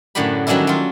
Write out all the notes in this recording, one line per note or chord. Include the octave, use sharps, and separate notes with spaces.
F#2 A2 D3 F#3 G4 B5
D#3 F#3 G3 C#4 D4 E4
F#3 F4